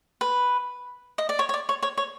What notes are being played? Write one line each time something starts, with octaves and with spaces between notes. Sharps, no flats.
B4
D#5
D5
C#5
C#5
D5
C#5
C#5
C#5